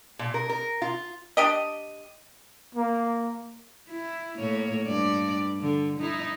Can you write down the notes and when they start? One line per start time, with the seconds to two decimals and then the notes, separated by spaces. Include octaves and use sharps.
0.19 A#2
0.34 A#4
0.49 A#4
0.82 F4
1.37 D4 G4 D#5
2.75 A#3
3.89 E4
4.38 A2 A#3 C#5
4.86 G2 D5
5.60 D3
6.00 D#4 E4